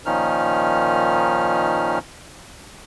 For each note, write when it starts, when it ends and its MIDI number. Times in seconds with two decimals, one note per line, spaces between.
0.06 1.99 46
0.06 1.99 51
0.06 1.99 53
0.06 1.99 61
0.06 1.99 63
0.06 1.99 89